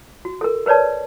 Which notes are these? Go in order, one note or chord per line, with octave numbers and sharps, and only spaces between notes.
F#4
A4 A#4
A#4 B4 C#5 D5 A5